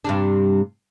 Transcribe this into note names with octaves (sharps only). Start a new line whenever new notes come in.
G2 C3 D4